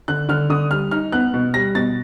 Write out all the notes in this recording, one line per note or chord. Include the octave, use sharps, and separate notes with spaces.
D3 F#6
D3 F6
D3 D#6
G3 F6
D#4 F6
B3 F#6
B2
G3 A#6
B2 A6